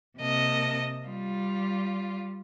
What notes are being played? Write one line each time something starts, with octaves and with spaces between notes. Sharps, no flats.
C3 A#3 D#5 A5
G3 F4